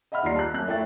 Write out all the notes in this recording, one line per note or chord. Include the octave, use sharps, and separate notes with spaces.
D#5 E5 F#5 B5 F6
D#2 G3 F4 D5 A#5 C7
A5 F#6
F#2 F#6
A3 E4 C#5 E5 G5 A6